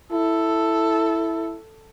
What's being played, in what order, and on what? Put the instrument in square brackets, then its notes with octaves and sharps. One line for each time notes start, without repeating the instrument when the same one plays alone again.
[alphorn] E4 [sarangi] A4